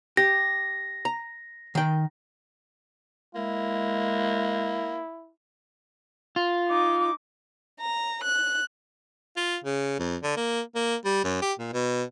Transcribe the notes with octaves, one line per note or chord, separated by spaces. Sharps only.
G4 A#6
A#5
D#3 G5
G#3 A#3 E4
F4
D#4 D6
A#5
F#6
F4
C#3
F2
D3
A#3
A#3
G3
F#2
G4
A#2
B2